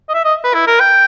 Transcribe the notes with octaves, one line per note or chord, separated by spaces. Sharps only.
D#5
E5
D#5
B4
E4
A#4
G5